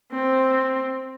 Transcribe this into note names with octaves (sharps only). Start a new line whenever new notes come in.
C4